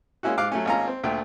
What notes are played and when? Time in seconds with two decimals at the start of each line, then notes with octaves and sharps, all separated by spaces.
0.23 G#3 A#3 C#4 E4 F#4
0.37 G#2 F5 D6 F#6
0.52 F#3 A3 C#4
0.65 G#1 A#3 C#4 F4 A#5
0.88 C4
1.03 D2 A#2 A3 G5